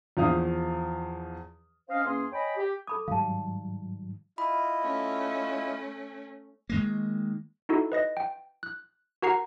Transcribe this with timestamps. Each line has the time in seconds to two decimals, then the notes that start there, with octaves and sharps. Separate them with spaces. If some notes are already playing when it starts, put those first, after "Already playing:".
0.17 E2 F3 F5 D#6
1.89 C4 C#4 C5 D#5 F5
2.04 E2 A#3 C#4 G#4 C6
2.33 C#5 D#5 G5 G#5 B5
2.57 G4
2.87 A4 B5 D6 D#6
3.08 G#2 D#3 F#3 G3 F5 A5
4.38 E4 F4 D#5 B5
4.82 A3 C#4
6.70 D#3 G#3 A#3
7.69 D#4 E4 F#4 A4
7.92 B4 D#5 A#6
8.17 G5
8.63 F#6
9.22 F#4 A#4 F#5 A#5 C#6 C7